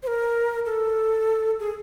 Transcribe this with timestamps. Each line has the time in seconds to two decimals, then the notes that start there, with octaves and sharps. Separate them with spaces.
0.03 C5
0.07 A#4
0.66 A4
1.60 G#4